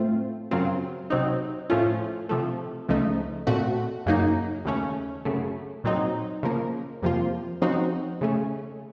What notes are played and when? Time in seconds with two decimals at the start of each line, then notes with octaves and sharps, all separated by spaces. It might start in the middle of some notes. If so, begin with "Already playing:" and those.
Already playing: A2 A3 C4 F4
0.51 F#2 C#3 F#3 C4 F4
1.10 C3 F#3 C4 D#4
1.70 A2 F3 A3 C#4 F4
2.29 C3 F3 A3
2.88 C#2 C#3 F3 A3 D#4
3.47 A#2 A3 C4 F#4
4.06 F#2 C#3 F#3 A#3 D#4
4.65 D#2 C#3 A3 C#4
5.25 F#2 C#3 A3
5.84 A#2 F#3 C4 D#4
6.43 C#3 F3 A#3
7.02 F2 C3 F3 A#3 F4
7.62 C#3 F3 C4 D#4 F#4
8.21 C#3 A3 C#4